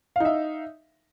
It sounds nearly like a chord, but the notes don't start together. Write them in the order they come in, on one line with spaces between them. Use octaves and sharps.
F5 D#4 E5